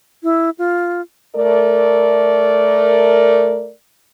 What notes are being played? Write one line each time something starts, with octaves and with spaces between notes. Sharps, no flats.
E4
F4
A3 A#4 D5